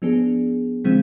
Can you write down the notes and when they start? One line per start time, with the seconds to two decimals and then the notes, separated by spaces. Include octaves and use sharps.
0.02 F3 B3 D4 G#4
0.84 D3 F3 G#3 C4 F4